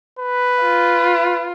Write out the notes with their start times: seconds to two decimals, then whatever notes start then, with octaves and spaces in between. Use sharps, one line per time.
0.19 B4
0.62 F4